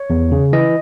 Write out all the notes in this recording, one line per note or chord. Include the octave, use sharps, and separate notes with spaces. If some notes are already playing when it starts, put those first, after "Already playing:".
Already playing: C#5
E2
C#3
E3 D#5